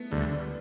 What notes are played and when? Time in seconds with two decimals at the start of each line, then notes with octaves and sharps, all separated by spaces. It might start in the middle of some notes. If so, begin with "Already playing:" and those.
Already playing: A3 B3
0.11 D2 G3